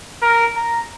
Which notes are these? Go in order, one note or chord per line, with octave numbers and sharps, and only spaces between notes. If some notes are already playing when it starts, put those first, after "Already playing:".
A#4
A#5